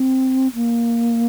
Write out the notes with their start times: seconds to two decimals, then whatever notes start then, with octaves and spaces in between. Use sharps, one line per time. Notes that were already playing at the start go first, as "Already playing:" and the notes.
Already playing: C4
0.55 A#3